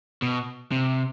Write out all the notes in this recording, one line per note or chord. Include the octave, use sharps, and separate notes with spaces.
B2
C3